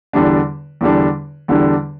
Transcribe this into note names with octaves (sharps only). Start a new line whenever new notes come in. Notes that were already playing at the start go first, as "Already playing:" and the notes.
E2 D3 G3 D4
E2 D3 G3 D4
E2 D3 G3 D4